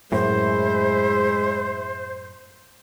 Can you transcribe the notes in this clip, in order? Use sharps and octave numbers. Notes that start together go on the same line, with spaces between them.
F#2 A2 G#3 E4 C5